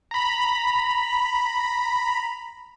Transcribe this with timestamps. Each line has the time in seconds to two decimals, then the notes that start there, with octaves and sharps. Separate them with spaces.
0.11 A#5 B5